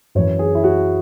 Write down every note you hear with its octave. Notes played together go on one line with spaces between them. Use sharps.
F#2 E3 C#5
G#4
E4
F#4